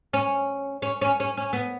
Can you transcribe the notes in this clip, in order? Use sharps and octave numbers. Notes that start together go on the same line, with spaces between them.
C#4
C#4
C#4
C#4
C#4
B3